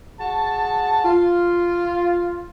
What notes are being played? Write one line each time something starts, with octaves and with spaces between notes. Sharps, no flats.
F#4 G#4 A5
F4